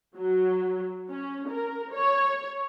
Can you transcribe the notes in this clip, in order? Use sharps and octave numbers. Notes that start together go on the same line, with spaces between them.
F#3
C#4
A#4
C#5